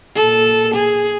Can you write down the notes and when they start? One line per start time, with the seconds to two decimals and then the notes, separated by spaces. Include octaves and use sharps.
0.16 A#2 A4
0.74 G#4